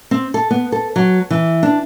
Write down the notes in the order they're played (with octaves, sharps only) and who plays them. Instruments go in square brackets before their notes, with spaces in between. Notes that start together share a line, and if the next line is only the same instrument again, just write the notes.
[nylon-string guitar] C4
A4
B3
A4
F#3
E3
D4